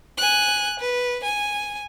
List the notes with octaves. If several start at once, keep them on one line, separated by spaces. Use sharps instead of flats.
G#5 F#6
B4
G#5